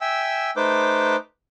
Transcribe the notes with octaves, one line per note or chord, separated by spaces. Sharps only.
E5 G5 G#5 E6
A3 D#4 B4 C5 D6 G6